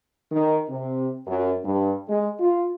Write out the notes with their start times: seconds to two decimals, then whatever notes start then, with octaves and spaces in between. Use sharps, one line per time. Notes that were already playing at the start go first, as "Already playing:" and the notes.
0.31 D#3
0.68 C3
1.26 F#2
1.64 G2
2.08 G#3
2.39 F4